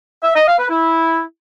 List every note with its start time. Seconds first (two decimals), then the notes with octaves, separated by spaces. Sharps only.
0.22 E5
0.34 D#5
0.46 F5
0.58 B4
0.70 E4